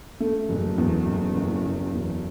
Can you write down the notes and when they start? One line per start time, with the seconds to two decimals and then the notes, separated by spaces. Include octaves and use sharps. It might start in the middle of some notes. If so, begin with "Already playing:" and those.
0.20 A3
0.49 F#1
0.78 E2
1.05 F#1
1.35 F#1
1.63 F#1
1.91 E2